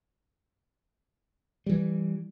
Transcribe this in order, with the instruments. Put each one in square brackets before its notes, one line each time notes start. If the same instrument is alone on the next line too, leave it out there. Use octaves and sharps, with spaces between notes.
[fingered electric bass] E3 G3